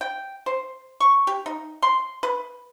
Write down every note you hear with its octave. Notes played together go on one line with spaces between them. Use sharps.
G5
C5
C#6
G4
D#4
C6
B4